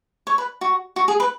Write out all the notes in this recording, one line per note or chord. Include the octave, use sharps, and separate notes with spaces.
C#5
B4
F#4
F#4
G#4
B4